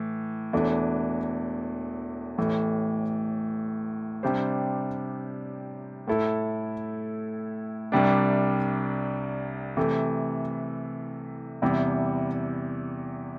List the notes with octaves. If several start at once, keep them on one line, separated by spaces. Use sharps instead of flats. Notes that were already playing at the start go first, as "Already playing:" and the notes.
Already playing: A2 E3
E1 E2 E3 A3 D4
A1 A2 E3 A3
C3 G3 D4 G4 C5
A2 A3 E4 A4
C2 C3 G3 D4
C3 E3 A3
E2 C3 E3 G3 E4